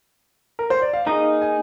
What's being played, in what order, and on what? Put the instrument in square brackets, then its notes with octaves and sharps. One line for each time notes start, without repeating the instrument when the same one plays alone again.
[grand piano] A#4
C5
D5
F5
[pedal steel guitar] A#3 D#4 G#4 D#5 [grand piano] A#5
[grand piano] G#5